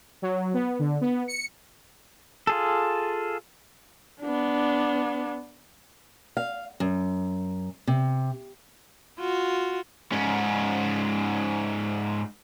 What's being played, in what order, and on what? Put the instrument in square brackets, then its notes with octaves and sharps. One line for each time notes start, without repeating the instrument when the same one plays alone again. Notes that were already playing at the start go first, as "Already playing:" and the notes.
[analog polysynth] F#3
B3
D3
B3
C#7
[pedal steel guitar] F4 G#4 A4
[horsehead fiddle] B3 D4
[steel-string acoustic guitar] F5
F#2
C3
[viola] F4 F#4
[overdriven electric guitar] G#2 C#4